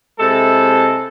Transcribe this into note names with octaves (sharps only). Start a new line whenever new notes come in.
C3 G#3 E4 A4